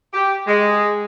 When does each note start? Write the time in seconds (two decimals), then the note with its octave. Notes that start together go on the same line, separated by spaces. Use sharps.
0.13 G4
0.47 G#3